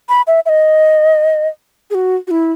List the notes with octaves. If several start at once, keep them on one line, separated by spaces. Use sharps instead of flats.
B5
E5
E5
D#5
G#4
F#4
F#4
E4